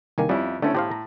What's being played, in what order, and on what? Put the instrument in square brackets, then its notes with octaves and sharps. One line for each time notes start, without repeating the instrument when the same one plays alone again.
[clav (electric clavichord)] C2 D#3 A#3 [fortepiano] G#5
[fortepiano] F2 E4 [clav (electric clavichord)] G3 C#4
[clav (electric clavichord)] D3 C4 [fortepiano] A3 C#4 E4
[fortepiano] A2 [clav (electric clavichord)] G4 C5 F5
[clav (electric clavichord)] A#5